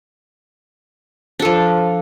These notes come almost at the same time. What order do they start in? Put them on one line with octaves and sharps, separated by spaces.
D4 A4 F3